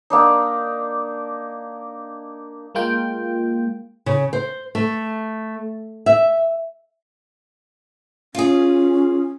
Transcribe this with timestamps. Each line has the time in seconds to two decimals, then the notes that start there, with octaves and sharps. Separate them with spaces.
0.10 A#3 D4 D#4
2.75 G#3 A#3 F4 G5
4.06 C#3
4.33 C5
4.75 A3
6.06 E5
8.35 C#4 F4 G#4